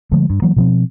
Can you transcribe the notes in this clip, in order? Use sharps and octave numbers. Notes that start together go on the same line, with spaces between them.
D3 F3 G#3 A3
G2
E3 F#3 A#3
B2 F3 C4